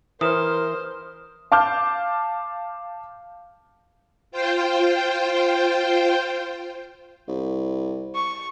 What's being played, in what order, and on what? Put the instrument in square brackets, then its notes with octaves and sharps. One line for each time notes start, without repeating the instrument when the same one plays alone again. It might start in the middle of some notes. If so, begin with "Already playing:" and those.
[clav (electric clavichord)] E3 [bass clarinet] A#4 [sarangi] C5 [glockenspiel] D#6 F6 E7
[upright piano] F5 A5 D6 F6 G6
[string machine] F4 C5 G5
[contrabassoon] C2
[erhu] C#6